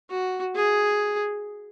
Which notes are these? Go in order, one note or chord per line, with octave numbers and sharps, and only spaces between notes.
F#4
G#4